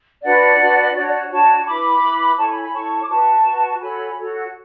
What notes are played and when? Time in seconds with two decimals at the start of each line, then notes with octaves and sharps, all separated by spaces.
0.23 D4 F#4 B4 D5 F#5
0.59 D4 F#4 B4
0.94 D4 F#4 C#5 D5
1.07 D5
1.30 D4 F#4 C#5 A5 C#6
1.66 E4 B4 B5 D6
2.02 E4 B4
2.37 E4 A4 C#5 A5 C#6
2.49 G#5 B5
2.61 G#5 B5
2.73 E4 A4 C#5 A5 C#6
3.02 D6
3.08 F#4 B4 A5 C#6
3.44 F#4 B4
3.80 F#4 A4 C#5 G#5 B5
4.16 F#4 A4 C#5